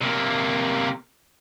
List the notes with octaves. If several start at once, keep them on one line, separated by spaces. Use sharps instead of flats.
C3 A#3